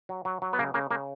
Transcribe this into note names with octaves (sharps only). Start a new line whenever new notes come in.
F#3
F#3
F#3
B3
C#3 A#3
C#3 A#3
C#3 A#3